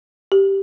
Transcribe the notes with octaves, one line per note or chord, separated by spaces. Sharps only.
G4